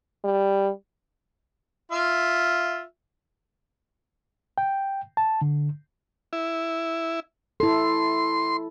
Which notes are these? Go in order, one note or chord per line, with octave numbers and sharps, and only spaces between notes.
G3
F4 E5
G5
A5
D3
E4
E4 A4 C6